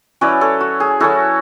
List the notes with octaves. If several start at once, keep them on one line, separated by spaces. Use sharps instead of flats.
F#3 C#4 E4 B4 D5
A4 C#5
F#4
G#4
F#3 C#4 E4 F#4 A4